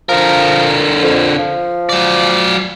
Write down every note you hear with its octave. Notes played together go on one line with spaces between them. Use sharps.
D3 F3 A#4
F2
F3
F#3 D5